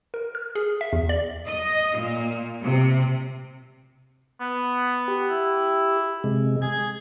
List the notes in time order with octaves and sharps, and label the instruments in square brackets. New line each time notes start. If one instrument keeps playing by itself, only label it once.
[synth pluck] A#4
F6
G#4
E5
E2
D5
[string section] D#5
A#2
C3
[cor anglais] B3
[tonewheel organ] G4
[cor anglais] E4
[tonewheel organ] C3 G#3
[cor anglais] G#4 [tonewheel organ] G#6